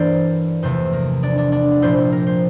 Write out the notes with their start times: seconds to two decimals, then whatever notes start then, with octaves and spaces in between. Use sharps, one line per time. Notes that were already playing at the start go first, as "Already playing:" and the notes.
Already playing: G2 E3 A#3 D4 E4 A#4 C5 D5
0.63 E2 C3 F3 A3 C5
0.93 A#4
1.23 D4 D5
1.38 D4 D5
1.52 D4 D5
1.82 A#1 A#2 F3 C4 E4 C5
1.97 C5
2.12 A#4
2.27 C5